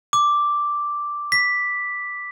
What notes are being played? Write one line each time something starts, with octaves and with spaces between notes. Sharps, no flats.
D6
B6